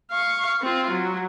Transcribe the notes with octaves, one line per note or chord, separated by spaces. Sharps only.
F5 C#6
C4 F4
F#3